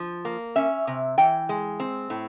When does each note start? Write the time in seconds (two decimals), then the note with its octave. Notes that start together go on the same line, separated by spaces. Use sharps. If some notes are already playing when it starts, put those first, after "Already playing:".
Already playing: F3
0.25 A#3
0.56 C#4 E5
0.87 C3
1.18 E3 G5
1.49 G#3
1.80 C4
2.10 A2